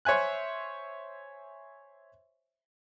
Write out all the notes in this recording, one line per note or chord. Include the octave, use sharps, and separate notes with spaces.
C5 C#5 E5 G#5 F#6